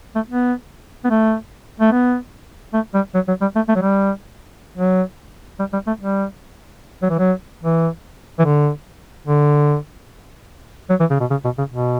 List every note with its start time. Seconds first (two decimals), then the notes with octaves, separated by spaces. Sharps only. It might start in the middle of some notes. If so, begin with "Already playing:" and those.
0.16 A3
0.28 B3
1.05 B3
1.10 A3
1.80 A3
1.92 B3
2.74 A3
2.94 G3
3.15 F#3
3.28 F#3
3.42 G3
3.56 A3
3.69 A3
3.76 F#3
3.82 G3
4.78 F#3
5.59 G3
5.73 G3
5.87 A3
6.00 G3
7.03 F#3
7.10 E3
7.19 F#3
7.63 E3
8.39 E3
8.45 D3
9.27 D3
10.90 F#3
11.00 E3
11.11 C#3
11.21 B2
11.31 C#3
11.45 B2
11.58 C#3
11.72 B2